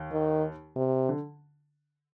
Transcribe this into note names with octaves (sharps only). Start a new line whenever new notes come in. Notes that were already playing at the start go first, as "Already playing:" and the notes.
Already playing: D#2
D#3
C3
D3